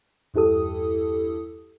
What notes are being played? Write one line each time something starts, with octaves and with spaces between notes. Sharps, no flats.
E2 G2 E4 G4 A4 D#6